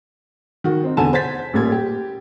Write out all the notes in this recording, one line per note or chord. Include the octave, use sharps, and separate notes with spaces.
D#3 F#4
C4 D#4
E2 B2 D3 G#5 A5 E7
C5 F#5 G#6 A6 B6
A1 A#2 G3 A#3 G#6
G4